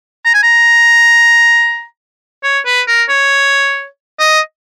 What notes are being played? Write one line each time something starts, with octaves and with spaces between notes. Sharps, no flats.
A#5
G#5
A#5
C#5
B4
A#4
C#5
D#5